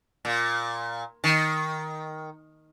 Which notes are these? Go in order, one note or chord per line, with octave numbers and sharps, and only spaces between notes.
A#2
D#3